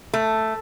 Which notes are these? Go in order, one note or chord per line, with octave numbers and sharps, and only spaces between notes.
A3